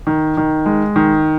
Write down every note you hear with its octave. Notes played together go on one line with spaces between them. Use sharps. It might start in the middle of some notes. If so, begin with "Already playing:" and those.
D#3
D#3
G#3
D#3